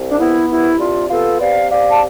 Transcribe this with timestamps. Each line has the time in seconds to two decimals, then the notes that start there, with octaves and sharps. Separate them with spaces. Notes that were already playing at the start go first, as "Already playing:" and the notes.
Already playing: C2
0.11 D4
0.19 B3 E4
0.49 C2 E4
0.79 C3 D4 F4
1.10 B3 F4 A4
1.40 C3 D5 F5
1.70 C3 D5 F5
1.90 A5